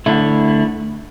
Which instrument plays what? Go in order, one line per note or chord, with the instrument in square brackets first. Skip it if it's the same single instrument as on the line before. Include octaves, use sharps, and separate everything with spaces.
[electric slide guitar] D3 A3 E4